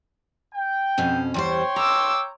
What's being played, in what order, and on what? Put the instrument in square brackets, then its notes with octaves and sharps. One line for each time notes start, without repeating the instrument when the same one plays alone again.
[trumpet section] G5
[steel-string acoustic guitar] F2 B2 C#4
[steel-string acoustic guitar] E2 G3 C5 [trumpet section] C#5 G5 C6
[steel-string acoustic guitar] A#5 [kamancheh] D6 E6